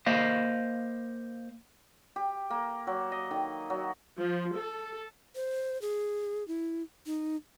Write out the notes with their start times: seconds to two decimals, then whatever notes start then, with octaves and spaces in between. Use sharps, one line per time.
0.06 A#3 C5 D#5 F5
2.16 G4
2.50 A#3
2.87 F#3
3.12 D#5
3.31 D#3
3.70 F#3
4.17 F3
4.56 A4
5.36 C5
5.82 G#4
6.48 E4
7.06 D#4